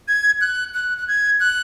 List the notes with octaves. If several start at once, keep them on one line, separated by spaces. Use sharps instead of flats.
G#6
F#6
F#6
F#6
G#6
F#6